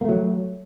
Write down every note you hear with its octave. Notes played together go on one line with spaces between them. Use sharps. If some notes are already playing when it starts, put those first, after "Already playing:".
F#3 A3 A#3